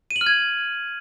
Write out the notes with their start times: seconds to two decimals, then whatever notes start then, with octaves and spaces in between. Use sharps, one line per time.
0.11 D#7
0.16 F#7
0.21 F6
0.26 G#6